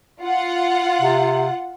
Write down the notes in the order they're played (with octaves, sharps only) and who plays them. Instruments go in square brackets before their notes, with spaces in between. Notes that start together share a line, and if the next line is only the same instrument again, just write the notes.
[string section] F4 F#5
[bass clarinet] C3